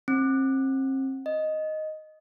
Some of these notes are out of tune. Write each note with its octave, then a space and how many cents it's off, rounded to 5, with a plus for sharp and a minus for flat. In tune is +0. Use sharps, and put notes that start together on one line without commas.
C4 +35
D#5 +0